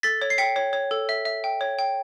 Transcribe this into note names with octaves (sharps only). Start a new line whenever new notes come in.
A4 A6 B6
C#5
C7
G5 B6 C#7
C#5
C#5
A4
E5
E5
G5
C#5
G5